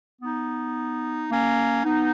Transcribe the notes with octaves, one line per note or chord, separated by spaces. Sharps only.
B3 D#4
A#3 C#4
B3 D#4